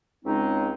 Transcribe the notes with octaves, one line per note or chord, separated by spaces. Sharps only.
C#2 C#3 G#3 C4 D#4